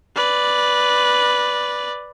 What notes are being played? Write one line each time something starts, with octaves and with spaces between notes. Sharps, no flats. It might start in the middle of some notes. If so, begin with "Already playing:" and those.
B4 D5